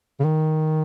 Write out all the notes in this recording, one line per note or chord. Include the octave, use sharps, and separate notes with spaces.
C#3
D#3